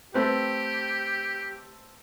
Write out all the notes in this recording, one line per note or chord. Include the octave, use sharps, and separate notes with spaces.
A3 C4 G4 B4